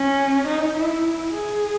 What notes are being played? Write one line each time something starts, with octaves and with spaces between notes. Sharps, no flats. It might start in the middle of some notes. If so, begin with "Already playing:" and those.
Already playing: C#4
D#4
E4
G#4